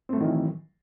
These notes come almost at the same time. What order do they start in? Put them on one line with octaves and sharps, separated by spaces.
C4 A3 F#3 D#3 E3